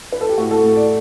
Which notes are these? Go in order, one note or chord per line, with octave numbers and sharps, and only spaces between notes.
B4
A4
G4
A2 F#4
A4
A2
D5